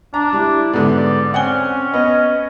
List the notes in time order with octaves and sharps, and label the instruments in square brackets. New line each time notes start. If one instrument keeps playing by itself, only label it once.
[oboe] D4 [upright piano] A#5
[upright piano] G3 [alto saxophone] E4
[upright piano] G#2 D3 [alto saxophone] B3
[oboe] D5
[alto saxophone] C4 [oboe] C#4 [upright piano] F#5 G#5 G7
[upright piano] B3 [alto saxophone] D#5